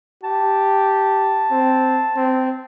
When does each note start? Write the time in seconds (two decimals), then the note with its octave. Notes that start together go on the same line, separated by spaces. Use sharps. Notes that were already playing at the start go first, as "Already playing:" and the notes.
0.24 G4 A5
1.51 C4
2.16 C4